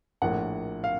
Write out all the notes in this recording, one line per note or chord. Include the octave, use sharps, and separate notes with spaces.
A#1 A2 F3 A#3 F#5
F5